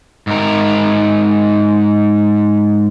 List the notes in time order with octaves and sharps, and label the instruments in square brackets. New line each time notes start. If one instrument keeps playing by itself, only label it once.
[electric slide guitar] G#2 A#4